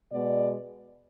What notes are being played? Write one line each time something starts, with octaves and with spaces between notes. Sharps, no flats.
B2 G#3 B3 D5